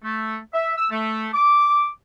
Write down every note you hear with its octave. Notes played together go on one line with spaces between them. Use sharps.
A3
E5
E6
A3
D6